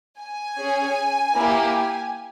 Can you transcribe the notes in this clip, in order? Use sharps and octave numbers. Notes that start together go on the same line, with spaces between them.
G#5
C#4 G#4
A#3 E4 G4